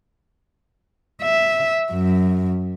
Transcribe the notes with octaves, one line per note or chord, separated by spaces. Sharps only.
E5
F#2